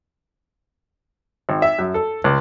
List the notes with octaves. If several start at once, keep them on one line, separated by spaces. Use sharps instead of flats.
G#1
E5
F#2
A4
C#2